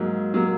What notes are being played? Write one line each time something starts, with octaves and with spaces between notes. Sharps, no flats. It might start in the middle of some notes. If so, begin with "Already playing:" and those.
Already playing: G#2 F#3 A#3
F#3 A#3